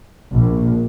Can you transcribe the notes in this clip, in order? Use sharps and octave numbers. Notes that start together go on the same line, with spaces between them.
A#1